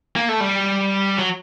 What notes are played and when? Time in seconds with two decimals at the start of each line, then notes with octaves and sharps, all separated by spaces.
0.16 A#3
0.29 A3
0.40 G3
1.18 F#3